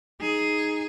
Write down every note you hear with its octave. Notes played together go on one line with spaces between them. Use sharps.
D#4 G#4